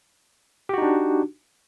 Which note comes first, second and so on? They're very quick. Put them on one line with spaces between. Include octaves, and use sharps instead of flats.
G4 F#4 D#4 D4